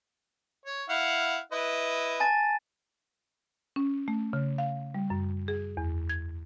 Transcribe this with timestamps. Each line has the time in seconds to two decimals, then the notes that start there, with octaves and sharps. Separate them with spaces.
0.65 C#5
0.89 E4 F5 F#5
1.52 E4 B4 D#5
2.20 G#5 A5 A6
3.76 C#4
4.08 A3
4.33 C#3
4.58 F5
4.94 G3
5.10 F#2
5.48 G#4
5.77 E2
6.09 G#6